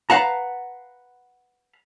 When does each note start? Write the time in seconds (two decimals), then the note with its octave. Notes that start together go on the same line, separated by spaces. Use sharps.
0.10 B4 F5 F#5 A5 A#5